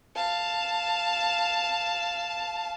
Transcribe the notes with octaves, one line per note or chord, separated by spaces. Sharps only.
F5 A5